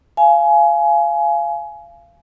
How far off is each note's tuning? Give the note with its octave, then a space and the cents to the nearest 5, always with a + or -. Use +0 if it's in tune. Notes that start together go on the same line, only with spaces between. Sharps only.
F5 -25 G#5 +20